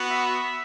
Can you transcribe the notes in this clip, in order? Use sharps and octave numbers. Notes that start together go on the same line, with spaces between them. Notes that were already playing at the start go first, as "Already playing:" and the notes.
Already playing: B3 F#4
E5